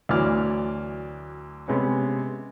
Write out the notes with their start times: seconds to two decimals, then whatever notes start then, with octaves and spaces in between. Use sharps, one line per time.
0.09 D2 E3 F#3 D5 F6
1.68 C3 G#3 B3 C#4